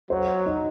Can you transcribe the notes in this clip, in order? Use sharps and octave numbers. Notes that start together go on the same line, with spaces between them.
F#3 C5
D#4